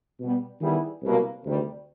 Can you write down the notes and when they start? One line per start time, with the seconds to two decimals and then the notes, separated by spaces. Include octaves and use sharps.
0.20 B2 G3 B3
0.61 D#3 G3 B3 E4 G#4
1.03 C2 B2 F#3 A#3
1.44 D2 C3 D#3 G3